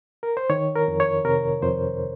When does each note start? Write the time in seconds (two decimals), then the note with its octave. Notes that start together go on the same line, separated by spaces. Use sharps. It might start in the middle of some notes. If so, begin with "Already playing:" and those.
0.23 A#4
0.37 C5
0.50 D#3 C#5
0.76 A#4
0.88 F2
1.00 C#5
1.25 C3 A#4
1.62 F2 C5